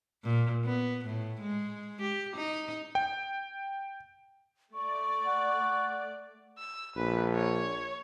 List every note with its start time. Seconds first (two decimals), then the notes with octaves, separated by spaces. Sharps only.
0.24 A#2
0.65 B3
1.05 A2
1.41 G#3
2.02 G4
2.36 D#4
2.95 G5
4.74 A3 D5 C#6
5.26 F#5
6.59 E6
6.96 A#1 B4
7.35 C#5